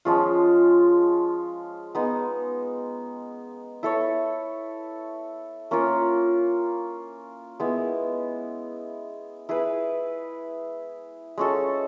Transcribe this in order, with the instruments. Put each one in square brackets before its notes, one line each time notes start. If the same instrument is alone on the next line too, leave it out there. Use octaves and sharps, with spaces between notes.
[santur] F3 G#3 C#4 F4
G#3 B3 D#4
E4 A4 C#5
A#3 C#4 F4 A#4
G#3 B3 E4
E4 G#4 B4
G#3 C#4 F#4 A4